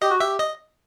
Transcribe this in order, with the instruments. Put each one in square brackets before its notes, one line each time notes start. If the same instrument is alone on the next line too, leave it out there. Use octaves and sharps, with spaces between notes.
[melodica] G4 [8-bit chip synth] D#5
[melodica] F#4
[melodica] G4 [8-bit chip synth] E5
[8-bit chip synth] D#5